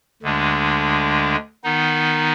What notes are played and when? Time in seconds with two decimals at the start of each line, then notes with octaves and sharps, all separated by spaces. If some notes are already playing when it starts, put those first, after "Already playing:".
0.22 D2 D3 G#3 D4
1.64 D#3 B3 D#4